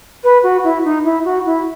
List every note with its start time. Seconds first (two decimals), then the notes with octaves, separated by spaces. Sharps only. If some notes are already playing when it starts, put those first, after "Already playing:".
0.23 B4
0.43 F#4
0.64 E4
0.84 D#4
1.04 E4
1.24 F#4
1.45 E4